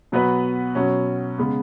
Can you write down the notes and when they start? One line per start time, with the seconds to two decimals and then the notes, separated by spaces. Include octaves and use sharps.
0.12 B2 F#3 B3 F#4 B4
0.75 B2 F#3 C#4
1.38 C#3 G#3 B3